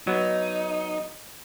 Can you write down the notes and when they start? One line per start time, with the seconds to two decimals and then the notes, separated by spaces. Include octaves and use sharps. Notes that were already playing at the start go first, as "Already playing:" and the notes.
0.07 F#3 B3 D#4